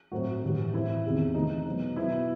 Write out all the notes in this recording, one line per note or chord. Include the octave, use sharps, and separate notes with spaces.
A2 F#3 A3 C4 F#4
A2 E3 G3
A2 E3 A3 C4 E4
E2 C3 D#3
C3 E3 A3 D#4
B2 F#3 B3
B2 F#3 B3 E4